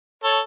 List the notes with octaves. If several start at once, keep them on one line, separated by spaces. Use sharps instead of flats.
A4 C#5